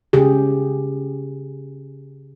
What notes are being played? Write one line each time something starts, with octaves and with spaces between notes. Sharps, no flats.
C#3 G4 G#4